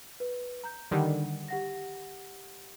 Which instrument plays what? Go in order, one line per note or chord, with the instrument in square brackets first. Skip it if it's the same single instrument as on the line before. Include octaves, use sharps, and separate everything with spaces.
[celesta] B4
A#5 G6
[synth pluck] D3 D#3 G3 [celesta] F#5
[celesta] G4 F#5 A#6